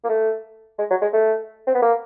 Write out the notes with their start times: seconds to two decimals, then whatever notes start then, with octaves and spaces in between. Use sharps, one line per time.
0.04 A#3
0.09 A3
0.78 G#3
0.90 F#3
1.01 G#3
1.13 A3
1.67 C4
1.75 B3
1.82 A#3